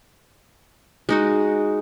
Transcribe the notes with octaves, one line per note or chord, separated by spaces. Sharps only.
G#3 D#4 F#4